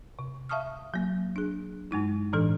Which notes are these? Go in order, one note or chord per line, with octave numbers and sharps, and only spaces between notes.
C3
E5 F5 A5 C#6 D#6 F6
F#3 A#3
D4 G#4
G2 G#3 D#4 E4
A2 D3 E3 D4 A4